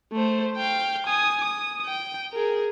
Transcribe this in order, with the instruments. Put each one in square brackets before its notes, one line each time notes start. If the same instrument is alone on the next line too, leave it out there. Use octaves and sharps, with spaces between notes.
[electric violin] A3 C5
F5 G5
G#5 D#6
D#6
G5
G#4 A#4